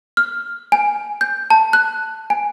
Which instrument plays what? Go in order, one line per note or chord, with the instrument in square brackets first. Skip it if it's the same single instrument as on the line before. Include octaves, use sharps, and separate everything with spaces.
[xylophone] F6
G#5
G6
A5
F#6
G#5